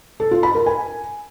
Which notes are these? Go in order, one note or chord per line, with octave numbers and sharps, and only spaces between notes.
A4
F4
B5
A#4
G#5